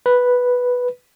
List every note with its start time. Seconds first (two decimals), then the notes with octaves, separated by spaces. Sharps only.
0.06 B4